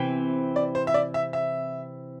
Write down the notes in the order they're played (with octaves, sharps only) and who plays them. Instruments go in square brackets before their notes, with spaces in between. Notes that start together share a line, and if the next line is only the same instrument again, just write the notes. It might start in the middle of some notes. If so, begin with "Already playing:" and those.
Already playing: [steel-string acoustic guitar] C3 E3 C4
[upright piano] D5
C5
E5
D5
E5
E5